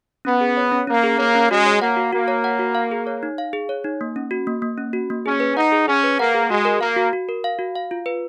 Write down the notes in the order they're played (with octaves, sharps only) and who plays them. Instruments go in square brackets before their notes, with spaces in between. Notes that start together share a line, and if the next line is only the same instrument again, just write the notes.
[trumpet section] B3 [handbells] C#4
[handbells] G#4
C#5
C#4
[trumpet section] A#3 [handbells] C#4
[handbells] G#4
[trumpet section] A#3 [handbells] C#5
[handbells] C#4
[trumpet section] G#3 [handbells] F#4
[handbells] C#5
[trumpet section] A#3 [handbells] F#5
[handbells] F#4
[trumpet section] A#3 [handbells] F#4
[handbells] C#5
F#5
F#4
F5
G#4
C#5
D#4
F5
G#4
C#5
D#4
A#3
C#4
F#4
A#3
A#3
C#4
F#4
A#3
[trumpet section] C#4 [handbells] G#4
[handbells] B4
[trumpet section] D#4 [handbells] F#5
[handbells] G#4
[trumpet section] C#4 [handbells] G#4
[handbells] B4
[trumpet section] A#3 [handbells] F#5
[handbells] G#4
[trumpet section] G#3 [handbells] F#4
[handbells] A#4
[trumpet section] A#3 [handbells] F5
[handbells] F#4
F#4
A#4
F5
F#4
F5
F4
B4